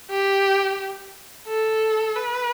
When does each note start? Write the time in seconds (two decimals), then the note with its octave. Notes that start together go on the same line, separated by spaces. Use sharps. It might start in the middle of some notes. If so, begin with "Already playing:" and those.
0.11 G4
1.48 A4
2.16 B4